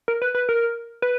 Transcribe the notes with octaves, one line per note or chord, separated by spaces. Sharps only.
A#4
B4
B4
A#4
B4